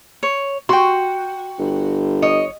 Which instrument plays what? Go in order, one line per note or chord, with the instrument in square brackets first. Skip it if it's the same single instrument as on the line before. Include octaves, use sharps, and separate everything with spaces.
[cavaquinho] C#5
[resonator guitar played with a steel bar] F#4 [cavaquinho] G5 C6
[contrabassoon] G1
[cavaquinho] C#5 [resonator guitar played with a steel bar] D#5